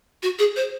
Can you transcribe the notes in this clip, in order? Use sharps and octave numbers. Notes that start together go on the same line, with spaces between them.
F#4
G#4
C5